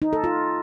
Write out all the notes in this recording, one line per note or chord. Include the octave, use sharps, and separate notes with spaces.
D#4
A4
F4